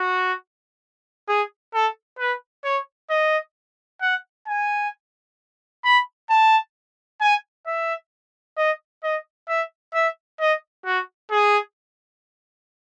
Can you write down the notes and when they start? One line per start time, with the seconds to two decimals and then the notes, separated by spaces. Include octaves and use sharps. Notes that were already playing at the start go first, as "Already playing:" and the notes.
Already playing: F#4
1.28 G#4
1.74 A4
2.19 B4
2.64 C#5
3.10 D#5
4.02 F#5
4.48 G#5
5.85 B5
6.30 A5
7.21 G#5
7.67 E5
8.58 D#5
9.04 D#5
9.49 E5
9.94 E5
10.40 D#5
10.86 F#4
11.31 G#4